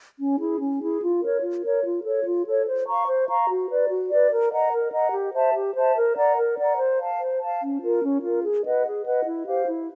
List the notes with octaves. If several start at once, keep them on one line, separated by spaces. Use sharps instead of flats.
C#4
E4 G#4
C#4
E4 G#4
F4
A#4 C#5
F4
A#4 C#5
F4
A4 C#5
F4
A4 C#5
C5
F5 A#5 C#6
C5
F5 A#5 C#6
F#4
B4 D5
F#4
B4 D5
A#4
D#5 F#5 A#5
A#4
D#5 F#5 A#5
G4
C5 E5 A5
G4
C5 E5 A5
A#4
D5 F#5 A#5
A#4
D5 F#5 A#5
C5
F5 A5
C5
F5 A5
C#4
F4 A#4
C#4
F4 A#4
G#4
B4 D#5 F#5
G#4
B4 D#5 F#5
E4
G4 C5 F5
E4